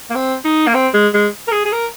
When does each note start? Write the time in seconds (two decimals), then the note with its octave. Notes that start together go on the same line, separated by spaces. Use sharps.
0.10 A#3
0.15 C4
0.45 D#4
0.67 A#3
0.75 C4
0.94 G#3
1.14 G#3
1.48 A#4
1.52 G#4
1.65 G#4
1.73 A#4